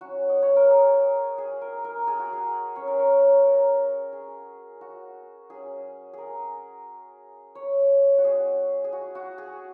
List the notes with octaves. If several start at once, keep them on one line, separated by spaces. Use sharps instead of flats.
F#3 C#4 F#4
D#5
C#5
A#4
G#4
G#4
A#4
A#4
G#4
F#4
G#4
F#3 C#4 C#5
A#4
C#5
A#4
G#4
F#4
F#3 C#4 G#4
G#4 A#4
C#5
F#4
G#3 C#4 G#4
G#4
F#4
F#4
G#4